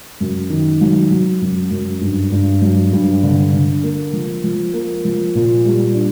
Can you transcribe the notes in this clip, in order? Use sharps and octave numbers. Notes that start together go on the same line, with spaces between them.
F#2
D#3
F#3
F#3
F#2
F#2
G2
G2
F#3
G2
D3
D3
A#3
F3
F3
A#3
F3
A#2
G3
D4